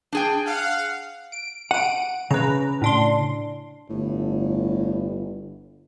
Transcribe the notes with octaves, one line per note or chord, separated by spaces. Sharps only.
D4 G#4 G5
F5 F#5
D7
F#5 D7 D#7
C#3 B4 A#5
A2 D4 C6
G1 A2